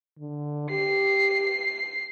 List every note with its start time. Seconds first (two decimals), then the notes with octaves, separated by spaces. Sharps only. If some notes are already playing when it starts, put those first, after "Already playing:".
0.19 D3
0.70 G4 C7